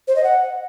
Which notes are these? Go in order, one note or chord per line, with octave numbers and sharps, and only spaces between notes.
C5
D#5
F#5